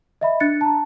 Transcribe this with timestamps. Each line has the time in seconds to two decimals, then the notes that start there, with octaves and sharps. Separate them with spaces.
0.21 D#5 E5 B5
0.40 D4 F#6 A6 C#7
0.61 A5 A#5